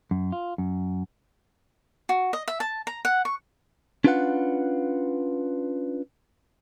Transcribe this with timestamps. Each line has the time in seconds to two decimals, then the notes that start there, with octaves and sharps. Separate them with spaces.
0.11 F#2
0.32 F4
0.58 F#2
2.09 F#4
2.33 D#5
2.48 E5
2.60 A5
2.87 A#5
3.05 F#5
3.25 C#6
4.04 C#4 D4 F4 B4 F5 F#5